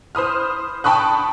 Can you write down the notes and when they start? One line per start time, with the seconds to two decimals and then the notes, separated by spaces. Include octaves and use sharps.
0.15 C5 B5 D#6 F6
0.84 G5 A5 B5 C#6 D#6 F#6